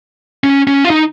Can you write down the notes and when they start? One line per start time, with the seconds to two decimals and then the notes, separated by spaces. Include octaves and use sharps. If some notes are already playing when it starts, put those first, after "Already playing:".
0.44 C#4
0.67 C#4
0.85 F4
0.90 D#4